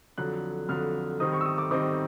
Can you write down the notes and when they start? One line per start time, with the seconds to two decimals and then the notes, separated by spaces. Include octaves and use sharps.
0.18 F2 D3 F#3 F#6
0.69 F2 D3 F#3 F6
1.20 D#3 G3 C4 D#4 D#6
1.33 C#6
1.41 E6
1.45 D#6
1.58 D6
1.71 D#3 G3 C4 D#4 D6